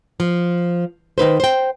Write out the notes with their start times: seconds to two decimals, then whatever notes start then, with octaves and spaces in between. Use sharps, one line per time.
0.20 F3
1.18 D#3 D#4 B4 C5
1.40 C5 G5